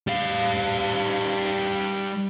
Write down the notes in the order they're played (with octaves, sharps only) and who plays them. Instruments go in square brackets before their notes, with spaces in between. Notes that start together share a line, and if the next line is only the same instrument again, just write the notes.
[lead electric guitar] G3 F5